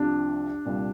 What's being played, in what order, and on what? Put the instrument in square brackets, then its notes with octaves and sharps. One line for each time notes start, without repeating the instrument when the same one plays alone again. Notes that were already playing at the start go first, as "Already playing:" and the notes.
Already playing: [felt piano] C2 C3 F3 D4
C2 A#2 G3